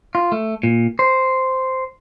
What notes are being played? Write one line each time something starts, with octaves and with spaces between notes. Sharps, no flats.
F4
A3
A#2
C5